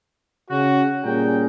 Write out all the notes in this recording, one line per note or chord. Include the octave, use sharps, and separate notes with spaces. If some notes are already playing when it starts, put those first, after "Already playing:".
C#3 C#4 F#4
A#2 G3 C#4 G#4 A#4 G5